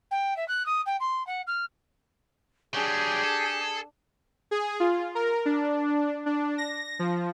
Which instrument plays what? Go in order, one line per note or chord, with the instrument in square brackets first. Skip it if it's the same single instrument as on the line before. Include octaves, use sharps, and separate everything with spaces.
[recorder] G5
E5
F#6
D#6
G5
C6
F#5
F6
[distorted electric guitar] F#3 G3 [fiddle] D4 [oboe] G4 [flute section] G#4
[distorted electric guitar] A4
[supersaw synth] G#4
F4
A#4
D4
D4
A#6
F3